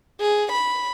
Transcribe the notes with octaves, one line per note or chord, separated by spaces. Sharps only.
G#4
B5